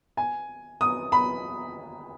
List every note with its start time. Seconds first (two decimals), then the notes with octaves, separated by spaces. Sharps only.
0.17 G#5
0.81 D#6
1.12 B5